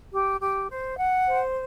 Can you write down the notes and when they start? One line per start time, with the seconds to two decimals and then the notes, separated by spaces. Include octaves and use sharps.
0.12 G4
0.40 G4
0.69 C5
0.98 F#5
1.26 C5